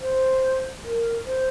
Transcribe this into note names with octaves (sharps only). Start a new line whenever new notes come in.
C5
A#4
C5